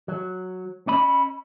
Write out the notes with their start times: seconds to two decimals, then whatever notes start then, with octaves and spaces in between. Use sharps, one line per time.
0.08 F#3
0.87 C#4 D#5 B5